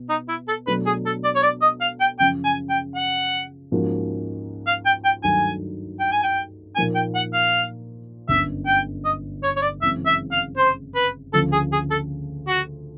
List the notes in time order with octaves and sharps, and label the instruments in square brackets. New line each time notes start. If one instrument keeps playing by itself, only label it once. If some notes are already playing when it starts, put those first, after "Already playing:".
Already playing: [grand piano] B2
[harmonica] D#4
E4
A4
[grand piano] B2 F#3 A3 D4 [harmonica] B4
[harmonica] G#4
A4
D5
C#5
D5
D#5
F5
G5
[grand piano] F#2 C#3 F3 [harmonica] G5
[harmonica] G#5
G5
F#5
[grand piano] G#2 F3 A#3 C#4 F#4
[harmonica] F5
G5
G5
[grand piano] G2 D#3 F#3 A3 [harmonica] G#5
[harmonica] G5
G#5
G5
[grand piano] A#2 F3 A#3 D#4 [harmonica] G#5
[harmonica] G5
F#5
F5
[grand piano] G1 F#2 D3 [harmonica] E5
[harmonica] G5
D#5
C#5
C#5
D5
[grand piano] F#2 C#3 E3 G#3 C4 [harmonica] E5
[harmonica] E5
F5
C5
B4
[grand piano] D2 C#3 F3 A3 [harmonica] A4
[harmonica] G#4
G#4
A4
F#4